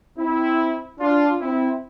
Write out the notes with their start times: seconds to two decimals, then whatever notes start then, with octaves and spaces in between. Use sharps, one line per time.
0.17 C4 E4
1.00 D4 F4
1.41 C4 E4